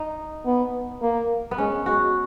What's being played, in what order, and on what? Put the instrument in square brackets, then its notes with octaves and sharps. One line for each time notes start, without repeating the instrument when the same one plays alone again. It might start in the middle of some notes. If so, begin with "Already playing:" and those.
Already playing: [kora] D#4
[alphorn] B3
A#3
[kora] B3
[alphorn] G#3 [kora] C#4
[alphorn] G#3 [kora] F#4